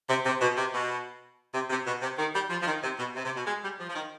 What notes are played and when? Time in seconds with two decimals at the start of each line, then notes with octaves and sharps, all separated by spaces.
0.09 C3
0.25 C3
0.41 B2
0.57 C3
0.73 B2
1.53 C3
1.70 C3
1.86 B2
2.02 C3
2.18 D#3
2.34 G3
2.50 F3
2.62 F3
2.67 D#3
2.83 C3
2.99 B2
3.15 C3
3.25 C3
3.36 B2
3.47 G#3
3.63 G3
3.79 F3
3.89 F3
3.95 D#3